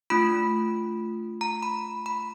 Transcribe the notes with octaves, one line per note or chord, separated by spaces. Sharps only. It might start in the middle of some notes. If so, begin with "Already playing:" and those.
A3 D4 F4 B5
A#5
B5
B5